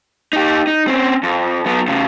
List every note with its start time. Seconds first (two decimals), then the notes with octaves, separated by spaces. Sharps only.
0.33 D#4 G4
0.67 D#4
0.87 C4 C#4
1.23 F2
1.66 F#3 B3
1.88 A2 C#3